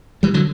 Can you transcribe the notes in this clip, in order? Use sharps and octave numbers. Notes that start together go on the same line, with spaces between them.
E3 G3
D3 F#3